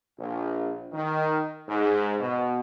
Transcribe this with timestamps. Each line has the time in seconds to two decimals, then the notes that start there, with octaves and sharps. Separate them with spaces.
0.19 A#1
0.92 D#3
1.69 G#2
2.20 B2